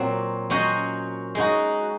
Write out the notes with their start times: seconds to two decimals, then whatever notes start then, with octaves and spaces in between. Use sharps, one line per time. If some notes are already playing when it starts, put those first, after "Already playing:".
Already playing: A#2 F#3 C4 F#4
0.50 F#3 C#4 F#4 C5 D#5
1.35 G#3 D#4 F#4